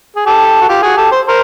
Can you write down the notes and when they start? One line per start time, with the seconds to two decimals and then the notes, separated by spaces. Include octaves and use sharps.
0.16 G#4
0.26 G4 A4
0.61 F#4
0.69 F4 G4
0.82 F#4 G#4
0.96 G4 A4
1.12 C5
1.27 A#4 C5